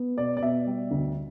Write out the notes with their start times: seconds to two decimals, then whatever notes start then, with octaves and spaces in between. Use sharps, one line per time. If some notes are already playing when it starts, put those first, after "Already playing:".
Already playing: B3
0.17 B2 D5
0.37 D5
0.42 B2 E5
0.67 G3
0.91 D2